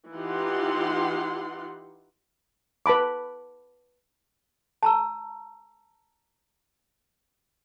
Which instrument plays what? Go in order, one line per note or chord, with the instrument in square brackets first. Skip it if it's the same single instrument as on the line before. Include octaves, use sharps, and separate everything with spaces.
[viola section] E3 D#4 F4 G4 F#5 C6
[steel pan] B4 A5 B5 D6
[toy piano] A5 A#5 E6